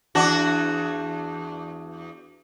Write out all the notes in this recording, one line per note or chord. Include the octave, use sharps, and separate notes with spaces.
E2 D4 F#4